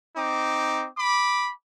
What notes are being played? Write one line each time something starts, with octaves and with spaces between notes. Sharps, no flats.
C4 D#4 D6
B5 D6